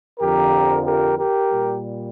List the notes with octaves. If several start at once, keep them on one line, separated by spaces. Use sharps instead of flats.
F2 D3 F3 G4 A#4
G4 A#4
G4 A#4
A#2 G3